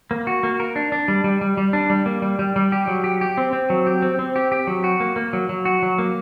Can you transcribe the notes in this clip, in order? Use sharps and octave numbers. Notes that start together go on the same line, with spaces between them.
A#3
F#4
A#3
A#4
D4
D4
G3
G3
G3
G3
D4
G3
A#3
G3
G3
G3
G4
F#3
G4
G4
C4
C4
F#3
G4
C4
C4
G4
G4
F#3
F#4
A#3
A#3
F#3
F#3
F#4
F#3
A#3